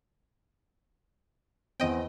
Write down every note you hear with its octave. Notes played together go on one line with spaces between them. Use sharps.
E2 C4 D#5 G5